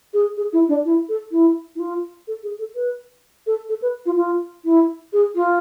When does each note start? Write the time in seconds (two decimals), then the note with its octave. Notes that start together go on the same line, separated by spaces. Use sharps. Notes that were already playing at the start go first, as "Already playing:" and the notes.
0.14 G#4
0.37 G#4
0.53 E4
0.69 D4
0.85 E4
1.09 A4
1.32 E4
1.75 E4
1.79 F4
2.28 A4
2.43 G#4
2.59 A4
2.75 B4
3.47 A4
3.69 A4
3.82 B4
4.06 F4
4.17 F4
4.65 E4
5.13 G#4
5.35 F4